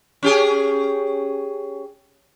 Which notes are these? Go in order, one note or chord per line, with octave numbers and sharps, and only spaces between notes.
C#4 G4 G#4